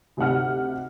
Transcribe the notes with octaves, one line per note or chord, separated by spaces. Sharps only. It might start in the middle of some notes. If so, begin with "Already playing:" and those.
D2 C3 D#4 F#5 F6